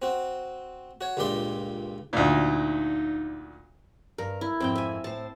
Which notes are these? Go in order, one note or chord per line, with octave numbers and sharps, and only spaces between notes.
C4 F#4
F#4 C#5
C#2 G2 A#2 G4 D5 C6
D2 A#2 D#4
G2 A#4
E4
F2 G#2 C4 G5
E5 G#5
A2 C5 A5